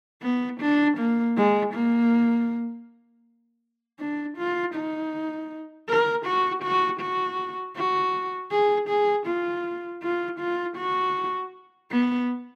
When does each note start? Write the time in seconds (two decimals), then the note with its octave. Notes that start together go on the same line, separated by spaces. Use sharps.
0.23 B3
0.61 D4
0.98 A#3
1.37 G#3
1.74 A#3
4.00 D4
4.38 F4
4.75 D#4
5.89 A#4
6.26 F#4
6.63 F#4
7.01 F#4
7.77 F#4
8.52 G#4
8.89 G#4
9.27 F4
10.03 F4
10.40 F4
10.77 F#4
11.91 B3